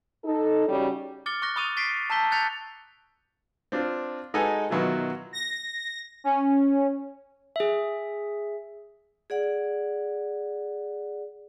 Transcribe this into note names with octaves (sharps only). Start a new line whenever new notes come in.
D#4 A4
C#3 G3 C#4 D#4 F#4 C#5
D6 F6 A6 C#7 G7
C#6 D6 F#6 A#6
B5 C#6 D#6 A6 D#7 F7
C#6 A6 B6 C7 D7
A5 A#5 E6 G6 B6 G7
F#6 G6 A6 B6 C#7 F7
C4 D4 F4
G#3 D#4 F#4 A4 B4 G#5
B2 D#3 F#3 B3 E4 F4
A#6
C#4
G#4 E5
G#4 D5 F#5